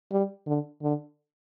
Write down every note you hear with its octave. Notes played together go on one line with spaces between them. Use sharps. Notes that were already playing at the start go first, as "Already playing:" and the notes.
G3
D3
D3